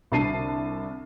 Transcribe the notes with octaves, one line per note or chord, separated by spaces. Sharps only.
C2 D3 A5 C7 D#7